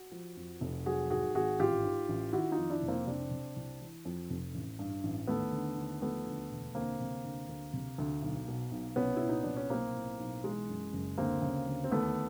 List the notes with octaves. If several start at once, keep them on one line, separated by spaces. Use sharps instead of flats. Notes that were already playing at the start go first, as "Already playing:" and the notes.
Already playing: F#4
F3
F2
F1
F#3 F#4 G#4
G#2 F#4 G#4
G#1 F#4 G#4
A1 F4 G4
G#2
A1
D#3 E4 F#4
D#4 F4
F2
D4 E4
F1
A#3 C4
C2 C4 D4
C3
C2
E3
F2
F1
A1
G2
A1
D#2 A3 B3
D3
D#2
F3 A3 B3
D2
E1
D2 A#3 C4
C3
D2
D2
C3
D2
B1
B2
B1
C2 B3 C#4
A#2 E4
D#4
C2 D4
C#4
B1 A#3 C4
A2
B1
E3 G#3
F#2
F#1
D2 A#3 C4
C#3
D2
C4
D#2 A3 B3